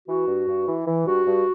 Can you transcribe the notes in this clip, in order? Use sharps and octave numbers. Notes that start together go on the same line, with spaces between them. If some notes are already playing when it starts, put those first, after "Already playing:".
E3 F#4
G2
G2
E3
E3
G2 F#4
G2